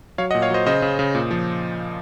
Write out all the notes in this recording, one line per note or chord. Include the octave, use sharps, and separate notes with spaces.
F#3 C#5 F5
D#5 F#5
A#2
C#5 F5
F#3 C5 D#5
C#3 C5 D#5
C#3
C#3
A#2
F3